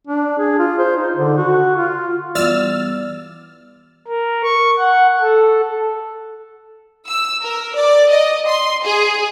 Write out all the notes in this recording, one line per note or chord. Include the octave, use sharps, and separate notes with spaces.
D4
G#4
F4
C5
D#4
D3
F#4
F4
E3 G3 B3 D5 E6 F6 A6
A#4
C#6
F#5
A4
E6
A#4
D5
D#5
C6
G#4